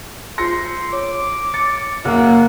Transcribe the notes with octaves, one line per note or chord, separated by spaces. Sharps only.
F4 G#4 C5 C6 E6 A#6 C#7
C#5 D6
A6 C#7
F#1 A#3 F#5